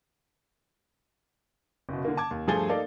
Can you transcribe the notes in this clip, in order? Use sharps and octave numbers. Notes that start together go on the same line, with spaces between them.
F#1 B2
D3 A#3
A5 D6 G#6
D#2
G2 F3 A3 G#4 A6 G7
A#3 D#4 A4 D5 F5